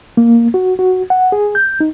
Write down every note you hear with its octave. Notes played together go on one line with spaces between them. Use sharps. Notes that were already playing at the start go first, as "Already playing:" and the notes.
A#3
F#4
F#4
F#5
G#4
G6
D#4